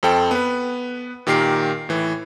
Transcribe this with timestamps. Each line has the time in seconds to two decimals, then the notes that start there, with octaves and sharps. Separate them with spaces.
0.03 F2 C4 A4 G5
0.31 B3 B4
1.27 A#2 D#3 G4 A#4 C7
1.89 A2 E3